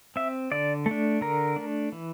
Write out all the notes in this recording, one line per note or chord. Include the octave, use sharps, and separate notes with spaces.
C4 E5
D3 D5
A3
D4
D3 A#4
A3 D4
E3